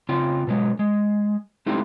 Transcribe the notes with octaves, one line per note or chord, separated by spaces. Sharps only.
C#3 C4 F4 G5
B2 F#3 G#3
G#3
G#3 A3 C4 D#4 E4 G4